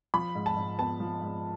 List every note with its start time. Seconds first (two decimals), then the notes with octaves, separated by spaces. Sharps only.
0.14 F3 B5
0.35 G#2
0.46 A5
0.57 G#2
0.78 B3 A5
1.00 F3
1.22 G#2